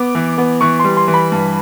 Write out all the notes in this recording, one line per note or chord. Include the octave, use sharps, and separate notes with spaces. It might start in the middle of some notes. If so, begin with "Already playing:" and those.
Already playing: B3 D6
E3
B3
E3 C#6
G3 C6
C6
E3
B5
G2